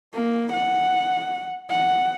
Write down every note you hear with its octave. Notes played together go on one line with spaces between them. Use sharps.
A#3
F#5
F#5